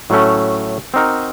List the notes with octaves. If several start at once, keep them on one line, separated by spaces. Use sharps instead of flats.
A2 F#3 A3 C#4
C4 D#4 F#4 A#4